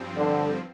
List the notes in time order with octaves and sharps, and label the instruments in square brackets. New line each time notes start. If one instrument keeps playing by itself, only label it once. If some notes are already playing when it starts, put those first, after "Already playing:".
Already playing: [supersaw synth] G2 F3 C4
[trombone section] D3